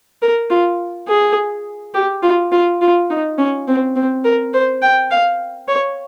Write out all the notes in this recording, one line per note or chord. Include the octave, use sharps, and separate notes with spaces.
A#4
F4
G#4
G4
F4
F4
F4
D#4
C#4
C4
C4
A#4
C5
G5
F5
C#5